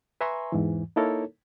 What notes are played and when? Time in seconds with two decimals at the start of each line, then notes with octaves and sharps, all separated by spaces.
0.21 B4 E5 G#5 A#5 C6 C#6
0.52 E2 G#2 E3
0.96 A#3 D#4 E4 A4 A#4 C#5